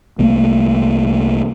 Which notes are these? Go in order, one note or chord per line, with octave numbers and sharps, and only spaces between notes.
C2 A3 A#3